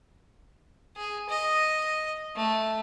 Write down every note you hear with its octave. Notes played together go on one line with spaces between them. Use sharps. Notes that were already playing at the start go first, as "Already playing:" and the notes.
G#4
D#5
A3